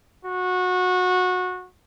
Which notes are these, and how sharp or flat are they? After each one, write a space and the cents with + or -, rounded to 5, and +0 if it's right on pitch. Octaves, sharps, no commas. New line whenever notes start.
F#4 -20